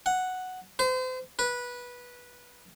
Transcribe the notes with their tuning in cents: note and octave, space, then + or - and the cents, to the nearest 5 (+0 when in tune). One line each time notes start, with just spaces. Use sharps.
F#5 +0
C5 -35
B4 -15